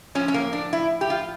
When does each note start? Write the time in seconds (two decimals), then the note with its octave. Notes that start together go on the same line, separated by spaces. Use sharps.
0.15 A2 F3 C#4
0.28 C#4
0.34 A#3
0.53 D4
0.73 E4
1.01 G4
1.10 F4